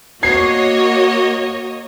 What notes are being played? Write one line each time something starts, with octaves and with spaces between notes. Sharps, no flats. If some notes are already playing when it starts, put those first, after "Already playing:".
A#3 F#4 C#5 D#5 G#6 C7